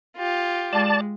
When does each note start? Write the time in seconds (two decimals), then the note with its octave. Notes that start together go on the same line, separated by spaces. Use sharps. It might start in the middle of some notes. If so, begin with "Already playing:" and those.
0.16 F4 G4
0.73 G#3 D5 A5